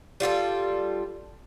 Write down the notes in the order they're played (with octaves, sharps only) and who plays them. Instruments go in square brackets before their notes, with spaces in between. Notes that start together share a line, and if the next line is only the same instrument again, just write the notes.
[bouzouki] G3 F4 F#4 A4